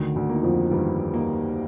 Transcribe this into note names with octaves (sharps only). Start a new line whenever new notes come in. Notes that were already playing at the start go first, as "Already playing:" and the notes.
Already playing: D2 D3 D#3
D2 D3
A#3 D#4
F2 F3
G2 D#3 G3
A#3 D#4